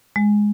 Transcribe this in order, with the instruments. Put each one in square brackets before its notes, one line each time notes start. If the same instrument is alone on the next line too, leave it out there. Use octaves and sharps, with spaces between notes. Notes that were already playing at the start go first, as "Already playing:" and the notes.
[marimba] G#3